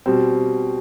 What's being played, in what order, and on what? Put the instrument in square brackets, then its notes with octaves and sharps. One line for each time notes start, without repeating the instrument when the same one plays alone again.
[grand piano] B2 G3 C4